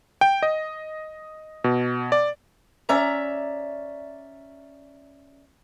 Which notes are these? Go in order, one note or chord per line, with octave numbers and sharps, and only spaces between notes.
G5
D#5
B2
D5
C#4 D5 E5 A#5